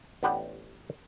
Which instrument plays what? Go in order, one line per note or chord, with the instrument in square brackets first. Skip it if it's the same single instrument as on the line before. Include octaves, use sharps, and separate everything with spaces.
[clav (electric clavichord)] A1 B3 D4 G4 B4 F#5